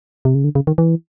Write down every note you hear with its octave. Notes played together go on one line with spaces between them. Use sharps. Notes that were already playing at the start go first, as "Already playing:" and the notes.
C3
C#3
D3
C#3
D#3
E3